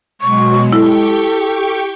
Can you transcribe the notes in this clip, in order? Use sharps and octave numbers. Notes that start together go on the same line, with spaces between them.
B2 F#3 G#3 C#6
E4 G4 A4 G5 C#6